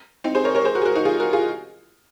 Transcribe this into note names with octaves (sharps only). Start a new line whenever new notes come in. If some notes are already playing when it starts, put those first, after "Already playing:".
C4 D#4
G#4 C5
A#4 C#5
A#4 C#5
G#4 C5
F#4 A#4
G#4
F#4 A#4
D#4 F#4
F4 G#4
F#4 A#4
F4 G#4